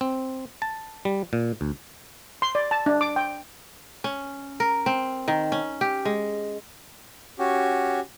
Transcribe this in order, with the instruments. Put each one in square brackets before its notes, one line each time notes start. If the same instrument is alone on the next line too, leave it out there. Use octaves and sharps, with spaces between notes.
[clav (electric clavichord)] C4
A5
G3
A#2
D2
[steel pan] C6
D5
A5
D4
D6
G5
[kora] C#4
A#4
C4
D#3
C#4
G4
G#3
[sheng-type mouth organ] C#4 F#4 G4